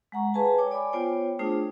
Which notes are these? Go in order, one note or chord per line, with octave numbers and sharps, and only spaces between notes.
G#3 F#5 A#5 C#6
G#4 B4 F5 G#5 A5
C#5 G5 D6
D5 G#5 B5 D6
B3 F4 C5 C#5 G5
A3 D4 F4 G#4 C5 D#6